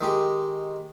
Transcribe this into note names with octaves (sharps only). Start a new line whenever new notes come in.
D#3 G#3 G4